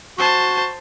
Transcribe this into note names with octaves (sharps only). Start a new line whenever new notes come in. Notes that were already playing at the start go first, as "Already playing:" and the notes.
F#4 C5 A5